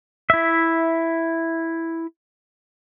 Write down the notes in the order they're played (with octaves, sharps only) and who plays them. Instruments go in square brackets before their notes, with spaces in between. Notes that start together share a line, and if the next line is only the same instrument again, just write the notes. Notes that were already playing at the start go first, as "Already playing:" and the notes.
[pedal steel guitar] E4 E5